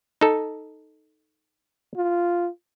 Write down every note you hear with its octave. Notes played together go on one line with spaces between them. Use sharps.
D#4 A4
F4